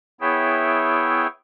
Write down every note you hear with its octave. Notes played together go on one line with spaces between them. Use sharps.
B3 E4 G#4 C#5 E5 G5